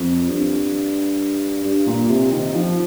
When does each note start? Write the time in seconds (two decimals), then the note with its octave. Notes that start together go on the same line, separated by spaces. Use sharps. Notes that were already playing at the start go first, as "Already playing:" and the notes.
Already playing: F2
0.29 G2
1.64 G2
1.87 A#2
2.10 C3
2.32 D#3
2.54 F3